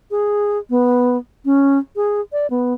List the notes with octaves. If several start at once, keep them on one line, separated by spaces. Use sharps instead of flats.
G#4
B3
C#4
G#4
D5
B3